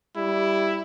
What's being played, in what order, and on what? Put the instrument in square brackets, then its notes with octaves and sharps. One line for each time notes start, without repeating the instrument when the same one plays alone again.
[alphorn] G3 [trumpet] E4